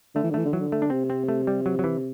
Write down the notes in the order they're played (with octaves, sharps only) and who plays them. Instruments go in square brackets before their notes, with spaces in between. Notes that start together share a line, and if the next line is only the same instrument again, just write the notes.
[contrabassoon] D3 [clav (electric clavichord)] A3
[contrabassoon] E3
D3
[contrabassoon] E3 [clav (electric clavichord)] A3
[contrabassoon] D3
[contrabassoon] E3 [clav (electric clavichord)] F#3
[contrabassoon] D3
[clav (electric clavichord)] A3
D4
[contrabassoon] C3 [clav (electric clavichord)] C4
[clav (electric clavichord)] C4
A3
G3
F#3
F#3
E3